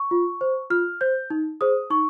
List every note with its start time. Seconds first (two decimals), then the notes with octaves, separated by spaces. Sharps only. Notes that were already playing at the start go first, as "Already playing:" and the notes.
Already playing: C#6
0.11 F4
0.41 C5
0.70 F4 F6
1.01 C5 G6
1.30 D#4
1.61 G#4 C5 D#6
1.90 D#4 C#6